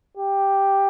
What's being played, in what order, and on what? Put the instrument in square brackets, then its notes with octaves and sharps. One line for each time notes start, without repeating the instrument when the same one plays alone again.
[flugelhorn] G4